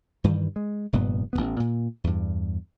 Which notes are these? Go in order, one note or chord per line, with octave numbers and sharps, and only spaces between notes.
G2 D#3 E3 G3
G#3
F1 G2 A#2 B3
A1 B2 B3
A#2
E2 G2